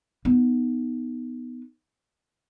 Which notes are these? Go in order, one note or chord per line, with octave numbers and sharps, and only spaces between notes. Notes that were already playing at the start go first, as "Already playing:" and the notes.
B3 D#4